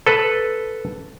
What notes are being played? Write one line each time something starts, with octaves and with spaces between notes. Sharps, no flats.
A4 B4